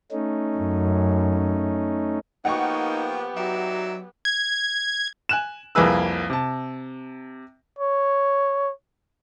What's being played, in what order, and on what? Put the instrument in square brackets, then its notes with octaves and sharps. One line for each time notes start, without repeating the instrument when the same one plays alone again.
[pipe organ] A3 C#4 D#4
[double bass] F#2
[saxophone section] F3 A#3 [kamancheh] B3 G4 [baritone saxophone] D#4 [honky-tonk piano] F#5 G5 C#6
[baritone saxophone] F#3 [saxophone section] D#4 D5 E5
[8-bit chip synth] G#6
[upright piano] G#5 F#6 E7
C2 F2 A#3 G#4 B4 E6
C3 A5
[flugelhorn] C#5